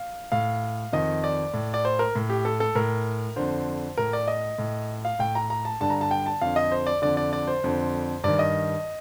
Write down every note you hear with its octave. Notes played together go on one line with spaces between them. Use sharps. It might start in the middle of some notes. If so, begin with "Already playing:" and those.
Already playing: F5
A2 F5
F2 D#3 D#5
D5
A2
D5
C5
A#4
A2
G4
A4
A4
A2 A#4
F2 D3 C5
A2 A#4
D5
D#5
A2
F5
A2 G5
A#5
A#5
A5
G2 D3 A5
A#5
A5
G5
A5
F2 D3 F5
D#5
C5
D5
F2 D3 D5
D5
D5
C5
F2 D3
G2 D#3 D5
D#5